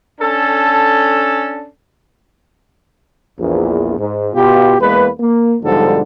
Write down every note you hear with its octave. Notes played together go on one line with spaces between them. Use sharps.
C#4 D4 A4
A#1 E2
G#2
B2 F4 G4
E2 G#3 A#3 B4
A#3
B1 G#2 D3 F3 G3 A4